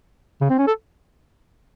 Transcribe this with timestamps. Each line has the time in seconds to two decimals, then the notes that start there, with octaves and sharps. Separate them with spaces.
0.41 C#3
0.50 C4
0.58 C#4
0.67 A4